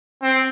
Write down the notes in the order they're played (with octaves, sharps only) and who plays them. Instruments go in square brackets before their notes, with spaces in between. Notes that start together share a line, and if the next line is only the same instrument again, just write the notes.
[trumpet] C4